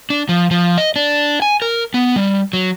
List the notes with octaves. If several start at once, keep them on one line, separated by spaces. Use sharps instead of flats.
D4
F3
F3
D#5
D4
G#5
A#4
B3
G3
F#3